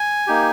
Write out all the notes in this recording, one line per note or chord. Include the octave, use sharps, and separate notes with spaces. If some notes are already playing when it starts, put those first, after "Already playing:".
Already playing: G#5
A#3 D#4 G4